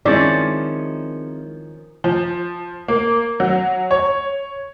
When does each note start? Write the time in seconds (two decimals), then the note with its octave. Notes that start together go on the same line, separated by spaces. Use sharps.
0.05 D#3 F3 G#3 C4 C#4 E4 D5
2.04 F3
2.88 A#3
3.40 F#3
3.91 C#5